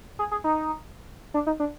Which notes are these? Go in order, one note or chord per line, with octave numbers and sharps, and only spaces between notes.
G#4
G#4
D#4
D4
D#4
D4